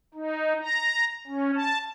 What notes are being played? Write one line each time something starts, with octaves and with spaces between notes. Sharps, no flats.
D#4
A#5
C#4
A5